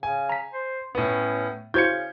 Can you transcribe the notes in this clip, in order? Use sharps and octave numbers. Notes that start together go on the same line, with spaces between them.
C#3 G#5
A#5 B6
C5
A2 B3 C#4
C#3 E4 F#4 C5 G6 G#6 C#7